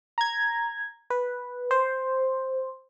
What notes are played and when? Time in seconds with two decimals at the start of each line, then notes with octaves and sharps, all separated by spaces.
0.18 A#5 G#6
1.10 B4
1.71 C5